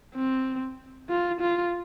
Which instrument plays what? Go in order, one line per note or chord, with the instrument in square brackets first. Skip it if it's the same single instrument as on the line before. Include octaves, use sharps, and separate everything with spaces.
[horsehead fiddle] C4
F4
F4